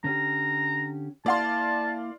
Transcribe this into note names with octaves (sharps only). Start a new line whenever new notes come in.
D3 C#4 G4 A#5
A#3 E4 D5 F5 A5 C6